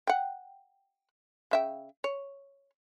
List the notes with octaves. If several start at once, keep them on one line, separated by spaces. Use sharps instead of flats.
F#5 G5
C#3 E5 G5
C#5